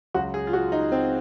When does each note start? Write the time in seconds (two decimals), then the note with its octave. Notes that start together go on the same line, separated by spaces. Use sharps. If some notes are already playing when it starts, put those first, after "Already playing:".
0.14 C#2 C#3 F#3 F#4
0.34 G#4
0.47 F4
0.53 F#4
0.72 D#4
0.92 C4